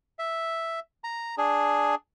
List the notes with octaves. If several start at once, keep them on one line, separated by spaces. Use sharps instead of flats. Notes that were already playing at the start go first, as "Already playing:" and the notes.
E5
A#5
D4 G#4